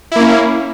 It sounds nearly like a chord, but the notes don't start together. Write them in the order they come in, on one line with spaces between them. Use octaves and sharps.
E4 A#3 C#4